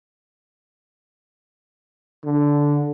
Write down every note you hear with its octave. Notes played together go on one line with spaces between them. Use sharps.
D3